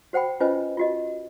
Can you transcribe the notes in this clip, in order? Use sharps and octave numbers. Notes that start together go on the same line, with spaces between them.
F#4 C5 F#5 G5 B5
C#4 F4 B4 C5 D#5 G#5
F4 F#4 D#5